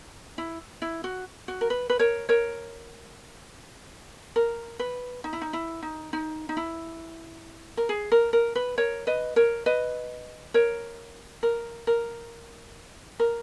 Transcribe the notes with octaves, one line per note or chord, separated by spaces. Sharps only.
E4
E4
F#4
F#4
A#4
B4
B4
A#4 C#5
A#4 C#5
A#4
B4
D#4
E4
D#4
E4
D#4
D#4
D#4
E4
A#4
G#4
A#4
A#4
B4
A#4 C#5
B4 D#5
A#4 C#5
B4 D#5
A#4 C#5
A#4
A#4
A#4